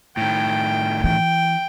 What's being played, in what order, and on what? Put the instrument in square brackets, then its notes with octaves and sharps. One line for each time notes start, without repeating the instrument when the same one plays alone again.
[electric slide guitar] A2 D#3 [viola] G5
[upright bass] E3 [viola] G5